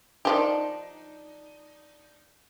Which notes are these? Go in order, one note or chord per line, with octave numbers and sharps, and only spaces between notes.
D#3 F3 D4 D#4 G4